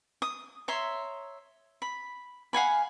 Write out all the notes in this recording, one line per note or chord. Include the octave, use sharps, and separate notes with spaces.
D#6
C#5 E5 A#5 C6
B5
F5 F#5 G#5 B5